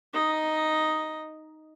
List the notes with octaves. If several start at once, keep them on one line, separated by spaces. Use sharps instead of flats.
D#4 D#5